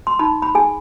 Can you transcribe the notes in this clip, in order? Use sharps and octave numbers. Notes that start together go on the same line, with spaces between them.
C6
D#4 B5
B5
G#4 G#5